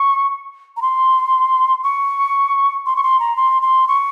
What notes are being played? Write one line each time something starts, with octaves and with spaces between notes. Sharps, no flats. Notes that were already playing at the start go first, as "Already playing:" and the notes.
Already playing: C#6
A#5
C6
C#6
C6
C#6
C6
A#5
C6
C6
C#6